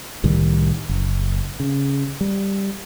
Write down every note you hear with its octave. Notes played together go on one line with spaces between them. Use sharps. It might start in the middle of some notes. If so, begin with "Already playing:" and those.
C2 A2 D#3 G3
F#1
C#3
G3